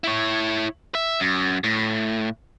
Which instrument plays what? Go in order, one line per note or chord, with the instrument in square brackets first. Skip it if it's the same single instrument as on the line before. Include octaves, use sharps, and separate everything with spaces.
[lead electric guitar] E4 C#5
E5
F#2
A2